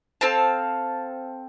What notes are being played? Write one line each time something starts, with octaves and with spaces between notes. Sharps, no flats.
C4 A4 F5 A5